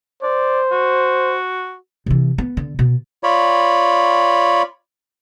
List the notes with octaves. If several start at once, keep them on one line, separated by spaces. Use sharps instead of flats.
C5 D5
F#4
C3 E3
B3
D3
B2
F4 C#5 D5 B5